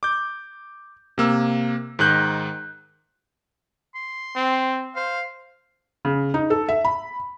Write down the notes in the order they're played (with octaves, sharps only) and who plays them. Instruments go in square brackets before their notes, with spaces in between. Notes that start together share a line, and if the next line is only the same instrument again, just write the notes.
[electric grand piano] D6 G6
C3 A#3 E6
G#2 D#3 D#4 F#6 G6
[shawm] C6
[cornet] C4
[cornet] C5 [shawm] F5
[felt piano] C#3
D#4
A4
E5
B5